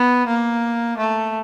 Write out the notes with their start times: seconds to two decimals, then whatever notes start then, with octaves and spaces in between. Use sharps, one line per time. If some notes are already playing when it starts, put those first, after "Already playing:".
Already playing: B3
0.27 A#3
0.98 A3